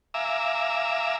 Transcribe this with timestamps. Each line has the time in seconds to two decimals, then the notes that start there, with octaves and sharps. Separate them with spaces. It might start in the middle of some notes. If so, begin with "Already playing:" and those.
0.14 E5 F5 G#5 A#5 D6 E6